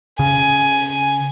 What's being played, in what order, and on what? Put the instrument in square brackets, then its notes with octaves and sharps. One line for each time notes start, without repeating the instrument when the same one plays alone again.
[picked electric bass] C#3 [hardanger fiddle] G#5